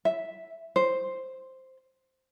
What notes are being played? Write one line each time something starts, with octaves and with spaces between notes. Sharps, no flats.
E5
C5